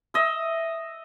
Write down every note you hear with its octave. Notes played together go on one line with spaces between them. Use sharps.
D#5 E5